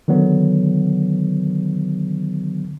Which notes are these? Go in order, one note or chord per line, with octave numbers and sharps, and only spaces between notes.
D3 D#3 F#3 B3